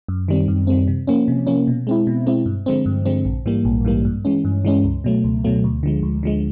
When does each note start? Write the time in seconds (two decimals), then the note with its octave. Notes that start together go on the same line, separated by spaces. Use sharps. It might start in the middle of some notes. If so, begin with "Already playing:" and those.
0.08 F#2
0.28 D#3 G3 C4
0.48 F#2
0.67 D#3 G3 C4
0.88 C3
1.07 F3 A#3 C#4
1.28 C3
1.47 F3 A#3 C#4
1.67 B2
1.87 G#3 C4 E4
2.07 B2
2.26 G#3 C4 E4
2.46 G2
2.66 D3 F3 G#3 C4
2.86 G2
3.05 D3 F3 G#3 C4
3.25 A#1
3.46 G#2 E3 G3 A#3
3.65 A#1
3.85 G#2 E3 G3 A#3
4.05 G2
4.25 E3 G#3 C#4
4.45 G2
4.65 E3 G#3 C#4
4.84 C#2
5.04 B2 F#3 A3
5.24 C#2
5.44 B2 F#3 A3
5.64 D2
5.83 D3 F3 G#3
6.03 D2
6.23 D3 F3 G#3